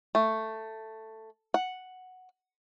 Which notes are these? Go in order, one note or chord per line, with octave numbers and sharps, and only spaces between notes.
A3
F#5